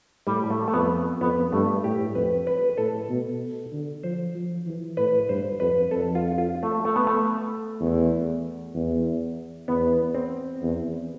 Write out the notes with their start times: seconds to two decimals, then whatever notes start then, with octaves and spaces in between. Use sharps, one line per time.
0.26 A2 G3
0.50 A3
0.68 A3
0.74 F2 B3
1.21 F2 B3
1.52 G2 A3
1.84 A2 G4
2.15 F2 B4
2.47 B4
2.78 A2 A4
3.09 B2
3.72 D3
4.03 F3 C5
4.34 F3
4.66 E3
4.97 A2 B4
5.29 G2 C5
5.60 F2 B4
5.91 F2 A4
6.15 F4
6.38 F4
6.63 A3
6.85 A3
6.96 B3
7.07 A3
7.80 E2
8.74 E2
9.68 E2 B3
10.15 C4
10.62 E2